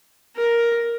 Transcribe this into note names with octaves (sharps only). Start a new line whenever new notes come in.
A#4